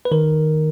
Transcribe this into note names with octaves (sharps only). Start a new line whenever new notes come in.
B4
D#3 A#4